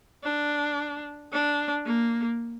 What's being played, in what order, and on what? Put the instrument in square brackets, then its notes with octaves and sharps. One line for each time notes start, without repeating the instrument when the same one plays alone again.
[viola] D4
D4
A#3